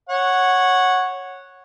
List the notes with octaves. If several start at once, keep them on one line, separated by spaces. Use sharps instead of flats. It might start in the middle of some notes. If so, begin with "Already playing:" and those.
C#5 F#5